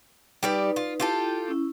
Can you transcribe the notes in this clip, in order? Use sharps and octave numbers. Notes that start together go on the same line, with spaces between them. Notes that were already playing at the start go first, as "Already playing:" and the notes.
G3 D#4 G4 B4 D5
F4
E4 F4 G4 A4
C#4 E4